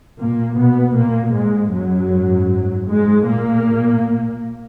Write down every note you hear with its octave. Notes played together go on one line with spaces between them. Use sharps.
A#2 A#3
B2 B3
A#2 A#3
G#2 G#3
F#2 F#3
G#2
G#2 G#3
A#2 A#3